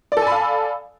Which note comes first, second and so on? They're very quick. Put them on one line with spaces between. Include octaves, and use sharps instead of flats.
D5 A4 G#5 B5 F5